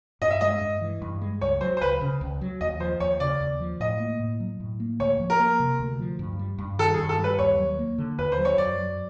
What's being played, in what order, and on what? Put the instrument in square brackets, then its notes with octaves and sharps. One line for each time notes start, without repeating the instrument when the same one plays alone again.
[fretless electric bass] G2 [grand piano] D#5
[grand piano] E5
[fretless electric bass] G#3 [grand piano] D#5
[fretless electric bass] G2
E3
G2
G#3
[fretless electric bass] C#2 [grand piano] C#5
[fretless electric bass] F#3 [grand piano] C5
[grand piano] C5
[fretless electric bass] C#2 [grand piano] B4
[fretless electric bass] C#3
C#2
F#3
[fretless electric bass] D#2 [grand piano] D#5
[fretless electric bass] F3 [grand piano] C5
[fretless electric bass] D#2 [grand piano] C#5
[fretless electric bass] C#3 [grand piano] D5
[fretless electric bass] D#2
F3
[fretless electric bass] A2 [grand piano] D#5
[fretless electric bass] A#3
A2
F#3
A2
A#3
[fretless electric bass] D2 [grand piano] C#5
[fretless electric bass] F3
[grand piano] A#4
[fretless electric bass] A#3
C3
D2
F3
G2
G3
G2
[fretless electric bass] D#3 [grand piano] A4
[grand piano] G#4
[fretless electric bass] G2
[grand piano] A4
[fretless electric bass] G3
[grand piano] B4
[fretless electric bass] D#2 [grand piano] C#5
[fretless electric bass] F#3
A#3
D3
[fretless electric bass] D#2 [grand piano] B4
[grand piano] C5
[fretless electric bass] F#3
[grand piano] C#5
[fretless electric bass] F#2 [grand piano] D5
[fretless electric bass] F#3